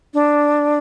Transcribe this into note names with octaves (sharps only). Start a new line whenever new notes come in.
D4